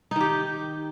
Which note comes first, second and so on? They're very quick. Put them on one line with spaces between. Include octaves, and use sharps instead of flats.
D#4 D#3 G4